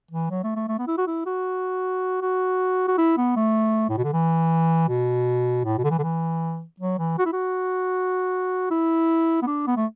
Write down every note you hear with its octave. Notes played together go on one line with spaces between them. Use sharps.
E3
F#3
A3
A3
A3
B3
E4
F#4
E4
F#4
F#4
F#4
E4
B3
A3
A2
B2
D3
E3
B2
A2
B2
D3
E3
D3
E3
F#3
E3
F#4
E4
F#4
E4
B3
D4
B3
A3